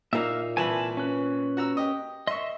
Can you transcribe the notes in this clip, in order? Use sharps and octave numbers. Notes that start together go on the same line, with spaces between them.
A#2 A#3 D#4 E4 E5 F5
C2 E3 G#5 A5 B5
C#4 B4
F#4 A#5 E6
G4 D#5
D#5 E5 C6 C#6